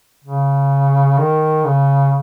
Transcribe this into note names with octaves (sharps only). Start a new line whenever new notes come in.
C#3
D#3
C#3